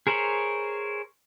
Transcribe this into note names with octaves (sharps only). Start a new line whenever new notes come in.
G#4 A#4 C5 C#5 B5